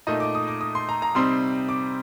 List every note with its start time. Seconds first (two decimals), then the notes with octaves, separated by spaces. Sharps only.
0.07 A#2 A3 D#4 D#5
0.20 D6
0.35 D#6
0.48 D6
0.61 D#6
0.75 C6
0.89 A#5
1.02 A#5
1.15 C3 G3 C4 D#4 C6
1.69 D6